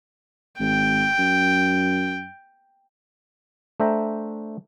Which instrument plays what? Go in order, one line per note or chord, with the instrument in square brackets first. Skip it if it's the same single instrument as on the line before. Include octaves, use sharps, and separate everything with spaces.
[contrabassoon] G#1 [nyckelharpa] G5
[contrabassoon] F#2
[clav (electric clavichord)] A3 D4 C5 E5 G5 A#5